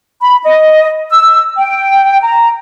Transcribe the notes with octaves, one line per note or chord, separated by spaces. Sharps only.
B5
D#5
E6
G5
A#5